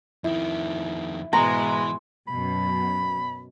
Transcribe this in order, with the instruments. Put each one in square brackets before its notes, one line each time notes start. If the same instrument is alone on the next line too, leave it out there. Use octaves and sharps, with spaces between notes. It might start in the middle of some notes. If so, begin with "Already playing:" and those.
[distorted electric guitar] F2 D#3 [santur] E4
[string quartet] G#2 B2 G#3 [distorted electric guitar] E3 [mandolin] A#5 [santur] C6 C#6
[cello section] F#2 B2 [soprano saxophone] B5